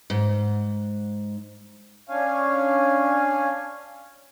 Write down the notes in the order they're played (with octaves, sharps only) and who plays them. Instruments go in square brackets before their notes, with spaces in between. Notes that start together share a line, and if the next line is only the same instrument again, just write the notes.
[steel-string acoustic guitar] G#2
[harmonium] C#4 D4 C#5 F5 G#5